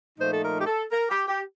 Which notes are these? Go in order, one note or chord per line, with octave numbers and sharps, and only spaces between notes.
A#2 F3 A3 D#4 C5
A4
A#4
G4
A4
A#4
G4
G4